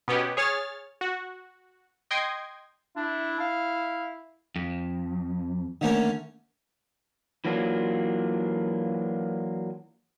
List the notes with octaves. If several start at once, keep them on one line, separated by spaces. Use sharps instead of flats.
B2 B3 C#4 G4
G#4 C#5 F6 A6
F#4
D#5 G5 C6 G#6
D4 E4
F5
F2
D3 D#3 A3 A#3 C#4 A#4
E3 F#3 A#3 D4 F4